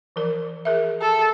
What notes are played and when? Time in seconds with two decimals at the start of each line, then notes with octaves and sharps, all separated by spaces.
0.16 E3 F3 A#4
0.65 G#4 A#4 E5
1.01 A4